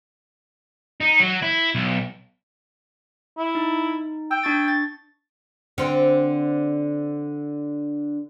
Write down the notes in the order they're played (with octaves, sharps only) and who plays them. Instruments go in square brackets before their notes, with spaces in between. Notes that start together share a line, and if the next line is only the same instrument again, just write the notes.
[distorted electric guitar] D#4
F#3
E4
B1
[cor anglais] E4
[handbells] D#4
[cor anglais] G5 [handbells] E6
[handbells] D4 C#6 A6
A6
[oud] D3 C4